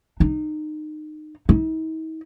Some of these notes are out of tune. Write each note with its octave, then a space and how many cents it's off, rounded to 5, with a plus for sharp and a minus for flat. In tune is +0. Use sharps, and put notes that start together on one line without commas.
D#4 -25
D#4 +45